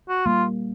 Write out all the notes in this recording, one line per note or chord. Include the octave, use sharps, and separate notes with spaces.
F#4
G3 A#3 F4